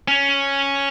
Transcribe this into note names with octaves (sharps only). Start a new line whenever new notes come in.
C#4